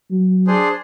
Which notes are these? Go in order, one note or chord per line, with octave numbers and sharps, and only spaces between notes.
F#3
D4 G#4 C5